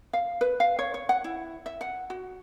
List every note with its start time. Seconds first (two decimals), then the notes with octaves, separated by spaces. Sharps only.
0.13 F5
0.41 B4
0.60 F5
0.79 C#5
0.94 C#5
1.09 F#5
1.24 E4
1.66 E5
1.81 F#5
2.10 F#4